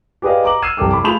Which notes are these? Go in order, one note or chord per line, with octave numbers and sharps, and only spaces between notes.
G4 G#4 B4 D5 D#5 F5
A#5 D6 F#7
E6 F6 G#6 C7 D#7 E7
C2 F2 A4 G5 D6
B5 D6
A3 F4 G#4 B5 G6 F7